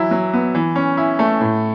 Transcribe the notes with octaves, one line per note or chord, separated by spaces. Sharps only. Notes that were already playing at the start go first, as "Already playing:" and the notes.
Already playing: E3 F#3 E4
F#3
B3
E3
C#4
E4
A3
A2